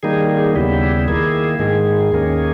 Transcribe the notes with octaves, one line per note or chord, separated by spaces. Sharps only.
D#3 G3 A#3 D#4 G#4
G#4
D#2 C#3 G3 B3 E4 G4
D#3 A#3 E4 G#4
G#2 D#3 G#3 G#4
D#2 D#3 A#3 C#4